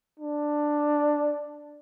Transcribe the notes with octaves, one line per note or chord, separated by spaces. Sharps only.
D4